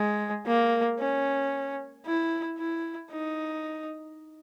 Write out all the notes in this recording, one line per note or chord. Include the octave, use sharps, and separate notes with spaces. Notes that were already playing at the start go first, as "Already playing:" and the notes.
Already playing: G#3
A#3
C#4
E4
E4
D#4